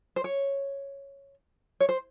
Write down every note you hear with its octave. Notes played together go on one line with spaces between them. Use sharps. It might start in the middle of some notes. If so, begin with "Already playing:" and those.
C5
C#5
C#5
C5